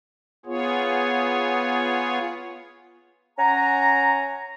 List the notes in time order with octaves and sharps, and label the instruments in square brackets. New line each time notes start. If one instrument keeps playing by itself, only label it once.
[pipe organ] B3 F4 G#4 C#5
[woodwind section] C#4 F#5 G#5 A#5